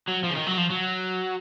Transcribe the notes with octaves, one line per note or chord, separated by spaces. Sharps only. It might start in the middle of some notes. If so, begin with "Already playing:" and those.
F#3
F3
C#3
D#3
F#3
F3
F#3